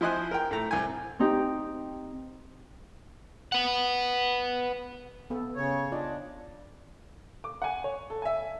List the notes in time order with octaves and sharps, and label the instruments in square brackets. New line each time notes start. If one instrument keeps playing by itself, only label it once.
[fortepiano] F3 E4 C5 D#5 G#5 F#6
A#4 G5
A2 A4 A#5
C2 G#5
[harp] C4 D#4 G4
[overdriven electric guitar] B4 F#5
[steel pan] B3 A4
[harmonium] C#3 C#5
[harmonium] D4 [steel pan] F4 D5 D#5
[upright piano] D6
F#5 G#5
C#5
A4
E5 G#5